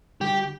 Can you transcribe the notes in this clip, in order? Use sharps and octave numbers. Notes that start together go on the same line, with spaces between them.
D3 G3 G4